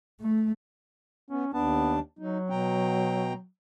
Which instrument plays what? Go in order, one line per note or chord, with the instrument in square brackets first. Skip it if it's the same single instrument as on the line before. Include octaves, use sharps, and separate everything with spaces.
[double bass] A3
[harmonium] B3 [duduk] C#4
[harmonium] D#2 D4 A5 [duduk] B3
[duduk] F#3 [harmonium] D#4
[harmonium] B2 G5 A#5